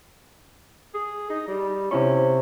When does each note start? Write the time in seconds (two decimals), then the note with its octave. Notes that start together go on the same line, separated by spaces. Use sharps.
0.94 G#4
1.30 D#4
1.47 G3
1.91 C3 C#4 E4 C#6